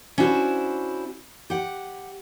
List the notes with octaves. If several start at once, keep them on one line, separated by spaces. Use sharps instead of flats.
C#4 D4 E4 F#4 C5
G4 F#5